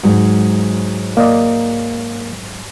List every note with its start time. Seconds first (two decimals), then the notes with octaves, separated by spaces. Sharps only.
0.03 G#2 F#3 G#3
1.17 A#3 D5 D#5